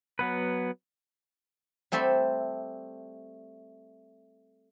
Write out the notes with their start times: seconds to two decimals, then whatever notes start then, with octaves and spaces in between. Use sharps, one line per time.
0.19 F#3 B3 B4
1.92 G3 A3 C4 A4 E5